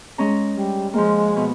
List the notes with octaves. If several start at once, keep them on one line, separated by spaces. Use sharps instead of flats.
G#3 C#4 A#5
G3
F3 G#3 A#3
B2